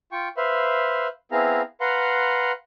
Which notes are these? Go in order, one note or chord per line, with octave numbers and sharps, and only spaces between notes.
F4 G5 C#6
B4 C5 E5 F5
B3 C4 E4 G#4 F5 A#5
B4 F5 F#5 A#5 C6